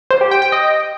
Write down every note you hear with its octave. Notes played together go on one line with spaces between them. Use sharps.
C5
G4
G5
G5
D#5